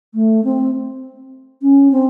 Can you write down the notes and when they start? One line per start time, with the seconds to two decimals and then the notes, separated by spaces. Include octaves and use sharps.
0.14 A3
0.44 C4
1.62 C#4
1.92 C4